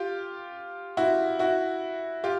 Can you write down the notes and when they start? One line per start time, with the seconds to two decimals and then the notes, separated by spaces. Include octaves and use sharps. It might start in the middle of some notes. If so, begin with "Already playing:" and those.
Already playing: F4 G4
0.97 E4 F#4
1.39 E4 F#4
2.24 F4 G4